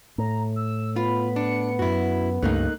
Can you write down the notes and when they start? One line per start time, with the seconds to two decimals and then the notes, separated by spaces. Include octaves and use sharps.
0.18 A2 A#5
0.56 E6
0.96 B3 F4 B5
1.36 D4 C#7
1.79 F#2 E4 F#4
2.43 C#2 G2 A3 A#3 D#4 F#6